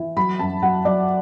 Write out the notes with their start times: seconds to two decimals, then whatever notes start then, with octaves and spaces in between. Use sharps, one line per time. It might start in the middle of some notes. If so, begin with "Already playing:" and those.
Already playing: E3
0.17 F#3 B5
0.39 F#2 A5
0.62 F#3 F#5
0.85 F#3 D5